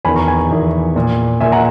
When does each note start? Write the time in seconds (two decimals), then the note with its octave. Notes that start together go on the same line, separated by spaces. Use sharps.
0.05 E2 D#3 G#5 B5
0.16 A#5 C#6
0.27 G#5 B5
0.51 E2 D#3
0.96 A#2
1.40 A#2 E5 G#5
1.52 F#5 A#5